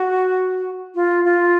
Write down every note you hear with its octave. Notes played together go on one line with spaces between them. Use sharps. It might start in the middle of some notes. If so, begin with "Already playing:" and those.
Already playing: F#4
F4
F4